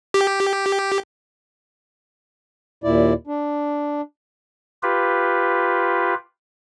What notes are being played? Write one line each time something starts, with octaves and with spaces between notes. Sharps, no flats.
G4
D#2 A#2 E4 D5
D4
F4 G4 B4